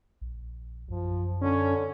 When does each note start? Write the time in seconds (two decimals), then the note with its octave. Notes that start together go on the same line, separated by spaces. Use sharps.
0.21 A#1
0.90 F#2 F3
1.42 D3 C#4